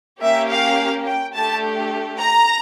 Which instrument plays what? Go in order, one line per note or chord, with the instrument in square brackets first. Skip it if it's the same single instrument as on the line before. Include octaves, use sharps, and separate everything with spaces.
[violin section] A#3 C#4 G4 E5
F5
G5
A3 D4 G4 A5
A#5